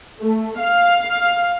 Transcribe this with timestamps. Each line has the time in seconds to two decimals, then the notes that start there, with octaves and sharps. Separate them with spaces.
0.21 A3
0.60 F5